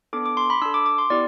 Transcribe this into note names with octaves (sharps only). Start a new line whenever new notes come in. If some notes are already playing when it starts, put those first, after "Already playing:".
B3 D4 A4 D6
D6
C6
B5
D4 A4 E6
D6
D6
C6
B3 E4 G4 D5